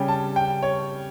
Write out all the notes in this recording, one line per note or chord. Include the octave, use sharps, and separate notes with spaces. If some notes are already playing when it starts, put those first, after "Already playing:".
Already playing: C#3 G3 C#4 G5
A5
G5
C#5